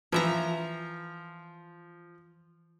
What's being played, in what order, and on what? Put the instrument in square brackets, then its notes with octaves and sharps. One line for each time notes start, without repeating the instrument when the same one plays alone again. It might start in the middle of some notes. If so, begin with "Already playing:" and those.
[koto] E3 E5 A#5 [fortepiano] F3